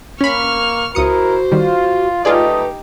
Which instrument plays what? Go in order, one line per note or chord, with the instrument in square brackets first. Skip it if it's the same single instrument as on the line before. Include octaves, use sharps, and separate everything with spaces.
[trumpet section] A#3 [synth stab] C#4 B5 [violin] C#6 F6
[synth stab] C#2 D#6 C#7 [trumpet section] E4 A#4 [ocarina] F#4 [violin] C5
[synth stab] D#3 G3 [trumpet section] F4
[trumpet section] A3 D#5 [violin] D#4 G4 [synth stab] F4 G#4 D5 [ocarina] B4